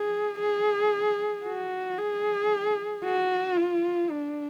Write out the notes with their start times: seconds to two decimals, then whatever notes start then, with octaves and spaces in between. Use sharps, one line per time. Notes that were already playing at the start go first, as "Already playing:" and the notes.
Already playing: G#4
0.39 G#4
1.45 F#4
1.99 G#4
3.04 F#4
3.57 F4
4.11 D4